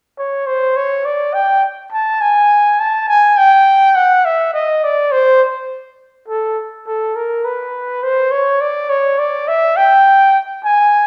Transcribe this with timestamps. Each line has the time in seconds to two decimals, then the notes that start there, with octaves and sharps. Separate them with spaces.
0.18 C#5
0.47 C5
0.77 C#5
1.05 D5
1.34 G5
1.92 A5
2.21 G#5
2.80 A5
3.09 G#5
3.37 G5
3.95 F#5
4.25 E5
4.54 D#5
4.83 D5
5.12 C5
6.28 A4
6.87 A4
7.15 A#4
7.45 B4
8.03 C5
8.31 C#5
8.61 D5
8.90 C#5
9.19 D5
9.48 E5
9.77 G5
10.65 G#5